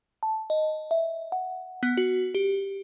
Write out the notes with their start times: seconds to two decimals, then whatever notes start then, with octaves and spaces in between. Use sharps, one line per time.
0.23 A5
0.50 D#5
0.91 E5
1.32 F#5
1.83 B3
1.97 F#4
2.35 G4